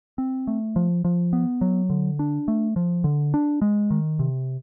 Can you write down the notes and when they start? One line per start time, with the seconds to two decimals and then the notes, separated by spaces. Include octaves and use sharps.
0.18 C4
0.47 A3
0.76 F3
1.05 F3
1.33 B3
1.61 F#3
1.90 D3
2.19 D4
2.48 A3
2.76 F3
3.04 D3
3.34 D4
3.62 G#3
3.91 D#3
4.19 C3